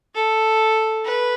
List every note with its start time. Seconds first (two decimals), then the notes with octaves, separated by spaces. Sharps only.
0.14 A4
1.05 B4